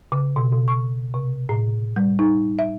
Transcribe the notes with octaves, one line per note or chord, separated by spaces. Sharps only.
C#3
B2
B2
C#6
C3
A2
G3
D#4
E5